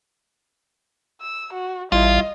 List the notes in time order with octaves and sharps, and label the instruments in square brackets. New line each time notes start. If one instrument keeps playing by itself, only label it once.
[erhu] E6
F#4
[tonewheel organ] A1 [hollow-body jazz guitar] G3 E4 [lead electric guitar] F4 [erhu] D#5